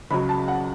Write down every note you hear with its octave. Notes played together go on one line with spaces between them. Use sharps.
C#2 C#3 F#3 B5
A5
F#5